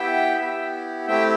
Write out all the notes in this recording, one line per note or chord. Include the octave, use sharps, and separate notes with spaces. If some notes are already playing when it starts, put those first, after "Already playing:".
Already playing: B3 E4 G4 E5 G5
B3 E4 G4
A3 C4 E4 G4 E5 G5